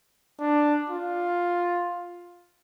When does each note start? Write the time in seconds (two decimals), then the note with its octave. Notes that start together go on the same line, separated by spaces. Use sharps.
0.40 D4
0.90 F4